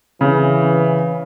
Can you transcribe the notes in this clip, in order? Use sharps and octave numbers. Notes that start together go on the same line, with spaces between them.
C#3 E3